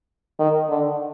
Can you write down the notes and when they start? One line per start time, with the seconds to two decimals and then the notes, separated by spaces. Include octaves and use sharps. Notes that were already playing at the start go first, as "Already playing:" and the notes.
0.40 D#3
0.70 D3